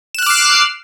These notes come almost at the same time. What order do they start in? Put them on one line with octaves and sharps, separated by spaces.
E7 F#6 F6 D6 C7